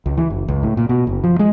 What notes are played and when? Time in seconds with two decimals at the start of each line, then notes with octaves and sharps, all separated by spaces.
0.06 C#2
0.17 E3
0.30 F#1
0.48 C#2
0.63 A2
0.77 A#2
0.89 B2
1.07 F#1
1.24 F3
1.39 G#3